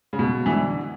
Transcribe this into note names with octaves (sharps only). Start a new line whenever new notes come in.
C#3
B2
E3
D3